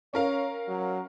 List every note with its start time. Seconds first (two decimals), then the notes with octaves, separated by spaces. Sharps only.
0.14 C#4 A#4 C#5 F5
0.68 F#3